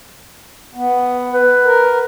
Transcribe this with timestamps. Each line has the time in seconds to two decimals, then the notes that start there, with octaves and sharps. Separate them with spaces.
0.75 B3
1.33 B4
1.65 A#4